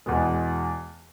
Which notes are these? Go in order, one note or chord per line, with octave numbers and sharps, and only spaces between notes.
E2 B2 G#3